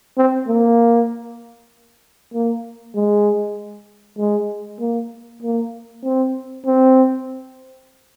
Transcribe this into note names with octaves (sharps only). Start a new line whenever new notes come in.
C4
A#3
A#3
G#3
G#3
A#3
A#3
C4
C4